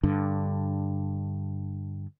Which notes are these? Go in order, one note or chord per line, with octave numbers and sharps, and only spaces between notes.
G2 D3